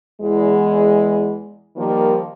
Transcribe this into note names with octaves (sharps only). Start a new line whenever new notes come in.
E2 G#3
D#3 F3 G3 A#3